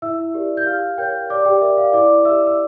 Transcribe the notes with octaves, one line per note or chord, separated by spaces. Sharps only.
E4 E5 E6
G4 A#4 D5
G6
G4 F5 F6
A#4 C#5 G5 G6
G4 D5 D6
G4 G5
A#4 D5 E5
F5
E4 D5 D6
G4 D5 E5 E6
E6